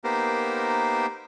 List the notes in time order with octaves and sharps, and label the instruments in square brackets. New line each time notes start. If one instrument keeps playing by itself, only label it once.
[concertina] A#3 B3 D#4 G4 A#4 C5